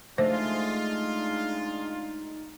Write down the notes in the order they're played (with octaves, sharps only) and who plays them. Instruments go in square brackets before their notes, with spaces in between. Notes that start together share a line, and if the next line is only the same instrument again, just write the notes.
[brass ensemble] G#3 D4 F4 [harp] A3 [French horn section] D#4 [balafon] C5